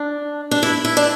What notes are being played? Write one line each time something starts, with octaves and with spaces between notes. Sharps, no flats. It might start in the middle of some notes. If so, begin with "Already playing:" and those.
Already playing: D4
D4
E4
E4
D4